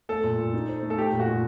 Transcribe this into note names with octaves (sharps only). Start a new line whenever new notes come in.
A3 A4
A#2
A#2
D#4
C5
A3
A4
A3 G4
A#2
F#4
A#2